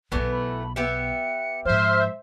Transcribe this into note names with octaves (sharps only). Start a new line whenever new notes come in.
B1 B2 E3 A3 B3
B5
B3 G4 E5 C#7
G#2 F3 C5 E5 F6